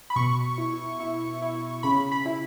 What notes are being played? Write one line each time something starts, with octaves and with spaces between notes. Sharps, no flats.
B5
B2 C#6
E4
E4
E4
C#3 B5
B5
E4